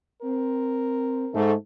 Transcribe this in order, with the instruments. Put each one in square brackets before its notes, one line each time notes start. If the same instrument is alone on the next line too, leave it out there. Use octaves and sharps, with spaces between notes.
[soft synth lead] C4 [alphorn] A#4
[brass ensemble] G#2 A3